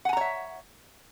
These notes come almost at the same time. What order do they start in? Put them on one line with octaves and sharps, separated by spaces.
F#5 G#5 A#5 C#5 E5